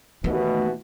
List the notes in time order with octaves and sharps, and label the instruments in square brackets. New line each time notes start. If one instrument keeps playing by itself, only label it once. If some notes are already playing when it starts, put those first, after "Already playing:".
[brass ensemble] D#2 B2 E3 [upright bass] A3